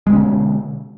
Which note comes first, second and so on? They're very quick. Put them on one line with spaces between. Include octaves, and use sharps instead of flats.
G#3 B2 C#4 D3